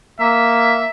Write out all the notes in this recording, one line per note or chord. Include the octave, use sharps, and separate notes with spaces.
A#3 E5